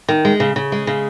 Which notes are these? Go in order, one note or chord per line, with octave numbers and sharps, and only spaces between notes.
D#3
G#3
C#3
C#3
G#3
C#3